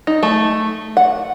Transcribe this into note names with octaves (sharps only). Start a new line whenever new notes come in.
D#4
A3
F#5